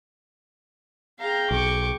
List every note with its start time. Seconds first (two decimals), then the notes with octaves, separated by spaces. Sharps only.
1.20 G#4 F5 G5 A#5
1.51 B1 C#6 D6